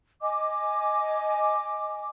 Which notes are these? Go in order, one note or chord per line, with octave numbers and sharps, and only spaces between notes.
D#5 G#5 D6